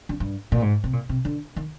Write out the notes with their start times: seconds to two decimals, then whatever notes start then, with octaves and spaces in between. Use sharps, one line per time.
0.09 D3
0.20 G2
0.52 A#2
0.62 G#2
0.84 C3
0.93 A#2
1.09 C3
1.25 D3
1.56 D#3